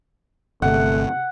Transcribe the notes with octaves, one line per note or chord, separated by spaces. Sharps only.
G1 C3 A3 F#5